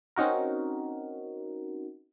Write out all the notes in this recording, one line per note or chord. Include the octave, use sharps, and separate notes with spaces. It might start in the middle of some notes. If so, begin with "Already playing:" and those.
C4 C#4 D#4 F#4 A#4